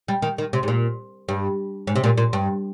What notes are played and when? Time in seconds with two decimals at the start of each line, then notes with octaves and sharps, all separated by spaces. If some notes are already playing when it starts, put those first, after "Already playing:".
0.08 G3
0.22 D#3
0.38 D#3
0.53 C3
0.63 G#2
0.68 A#2
1.29 G2
1.87 G#2
1.96 C3
2.04 A#2
2.18 A#2
2.33 G2